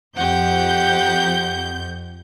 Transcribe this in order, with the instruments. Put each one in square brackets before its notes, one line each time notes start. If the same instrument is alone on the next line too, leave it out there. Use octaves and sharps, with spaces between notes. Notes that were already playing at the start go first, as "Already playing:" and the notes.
[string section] F2 G6 [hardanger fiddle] G4 F#5